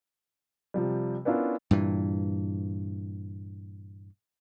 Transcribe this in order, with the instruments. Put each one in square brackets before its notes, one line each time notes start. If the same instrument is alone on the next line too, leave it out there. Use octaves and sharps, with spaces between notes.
[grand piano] C3 F3 G3
B3 C#4 D4 E4 F4 A#4
[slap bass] G2 A#2 E3